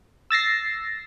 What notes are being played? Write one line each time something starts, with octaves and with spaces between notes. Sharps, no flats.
E6 A6 A#6 C7